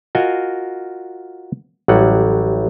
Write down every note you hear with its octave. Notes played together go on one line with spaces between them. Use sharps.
F4 F#4 A#4 D#5 F5 G#5
A1 F#3 G3 F#5